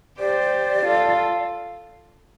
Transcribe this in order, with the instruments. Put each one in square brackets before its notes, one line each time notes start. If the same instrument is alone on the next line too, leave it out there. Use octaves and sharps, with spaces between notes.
[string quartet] G4 C5 [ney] D5
[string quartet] F4 A4